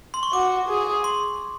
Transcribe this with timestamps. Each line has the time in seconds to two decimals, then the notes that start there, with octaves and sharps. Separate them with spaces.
0.14 C6
0.23 C#6
0.33 F#4 D6
0.69 G#4
1.04 C6